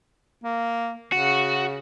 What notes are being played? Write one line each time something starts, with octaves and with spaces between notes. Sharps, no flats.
A#3
C#3 F#4